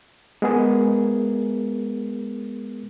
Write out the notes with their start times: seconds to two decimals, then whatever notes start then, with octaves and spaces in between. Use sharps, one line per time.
0.42 G#3 B3 G#4 A#4